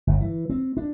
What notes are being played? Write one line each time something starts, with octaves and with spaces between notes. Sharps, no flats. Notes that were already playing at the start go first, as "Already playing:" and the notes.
G1
E3
C4
D4